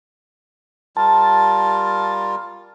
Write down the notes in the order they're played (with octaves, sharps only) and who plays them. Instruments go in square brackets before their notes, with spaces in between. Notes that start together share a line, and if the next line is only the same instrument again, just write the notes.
[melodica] G3 F4 A#4 [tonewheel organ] A5